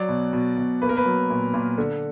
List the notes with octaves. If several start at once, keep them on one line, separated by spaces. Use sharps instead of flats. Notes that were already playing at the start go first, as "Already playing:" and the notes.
Already playing: F#3 D5
B2
B2
B2
A#3 B4
A#4
B4
F#3
A#2
A#2
D3